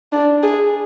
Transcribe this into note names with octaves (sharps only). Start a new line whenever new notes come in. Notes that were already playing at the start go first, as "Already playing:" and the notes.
D4
G#4